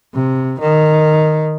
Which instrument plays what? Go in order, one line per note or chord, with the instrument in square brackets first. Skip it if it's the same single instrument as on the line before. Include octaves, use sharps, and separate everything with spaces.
[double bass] C3
D#3